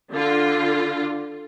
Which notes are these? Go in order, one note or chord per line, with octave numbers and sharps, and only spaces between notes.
D3 F4